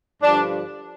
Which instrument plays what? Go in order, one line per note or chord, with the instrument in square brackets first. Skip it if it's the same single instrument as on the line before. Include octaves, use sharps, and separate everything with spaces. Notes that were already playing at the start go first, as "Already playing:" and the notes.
[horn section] G2 D3 F3 D4